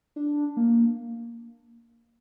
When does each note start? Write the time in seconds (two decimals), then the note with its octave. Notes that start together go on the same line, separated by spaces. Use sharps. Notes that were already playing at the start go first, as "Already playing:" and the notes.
0.16 D4
0.57 A#3